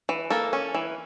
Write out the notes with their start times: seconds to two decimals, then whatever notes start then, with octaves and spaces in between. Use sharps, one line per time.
0.09 E3
0.30 A#3 A4
0.53 C#4
0.75 E3